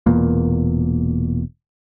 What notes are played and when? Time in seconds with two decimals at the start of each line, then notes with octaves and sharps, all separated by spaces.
0.06 E1 E2 A#2 A#3